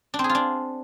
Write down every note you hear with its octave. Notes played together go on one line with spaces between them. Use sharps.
D4
C4
G#4
F4
D4